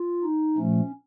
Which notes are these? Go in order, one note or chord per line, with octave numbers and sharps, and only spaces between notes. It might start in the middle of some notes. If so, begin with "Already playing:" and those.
Already playing: F4
D#4
A#2 F3 A3 C#4